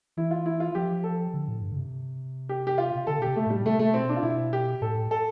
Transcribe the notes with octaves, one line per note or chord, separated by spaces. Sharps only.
E3 E4
F4
E4
F4
F3 G4
A4
D3
A2
G2
D3
C3
G4
G4
F4
C3
D3 A4
B2 G4
C3
A3
A2 G3
C3 A3
A3
B2 C4
D4
F4
B2 E4
G4
A2 A4
A4